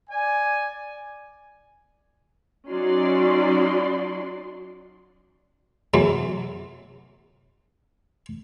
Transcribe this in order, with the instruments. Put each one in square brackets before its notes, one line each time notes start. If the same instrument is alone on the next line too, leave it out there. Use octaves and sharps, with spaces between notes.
[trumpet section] D5 G#5
[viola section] F#3 C#4 D#4 F#4 D5 C6
[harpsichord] E2 E3 F#3